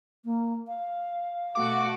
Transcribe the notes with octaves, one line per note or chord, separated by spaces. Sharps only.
A#3
F5
B2 A3 F#4 D6